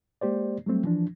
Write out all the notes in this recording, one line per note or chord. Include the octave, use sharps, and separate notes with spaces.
G#3 A#3 G4 C5 D5
F#3 G3 A3 C4
E3 F3 D4